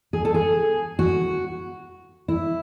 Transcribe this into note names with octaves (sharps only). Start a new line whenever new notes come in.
G#4
A4
G#4
F#4
E4